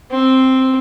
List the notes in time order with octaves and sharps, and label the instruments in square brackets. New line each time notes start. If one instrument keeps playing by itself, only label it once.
[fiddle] C4